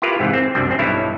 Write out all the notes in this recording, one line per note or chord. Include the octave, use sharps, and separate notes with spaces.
E4 F4 G4 A#4 B4
G#2 C3 E3
C4
C2 F#2 G3 D4 G5
A#1 C4
B1 G2 G3 E4 C#5